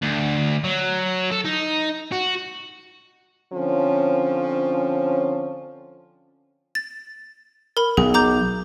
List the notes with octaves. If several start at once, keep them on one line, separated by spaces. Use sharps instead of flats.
D2
F#3
A4
D#4
F#4
D3 F3 C4 C#4
A6
A#4 B5
B1 G#4
A#5 D6 G6